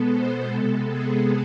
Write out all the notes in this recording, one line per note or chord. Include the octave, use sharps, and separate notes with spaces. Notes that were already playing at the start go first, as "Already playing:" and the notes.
Already playing: B2 G#3 B3 A4
C5
C3 G#3 B3 A4
G#4